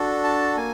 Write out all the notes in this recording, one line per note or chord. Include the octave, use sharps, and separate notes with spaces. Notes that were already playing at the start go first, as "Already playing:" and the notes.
Already playing: D4 F#4 A4
A5
A#3 G#5